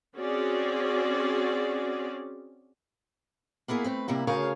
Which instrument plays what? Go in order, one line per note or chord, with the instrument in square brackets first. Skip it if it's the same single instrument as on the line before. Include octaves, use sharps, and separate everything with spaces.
[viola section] C4 C#4 F#4 G#4 D5
[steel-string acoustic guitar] A#3 B3 E4 G#4 A#4
A3 C4 B4
C3 G3 A#3 E4
D2 C#3 G#4 A#4 C#5 F5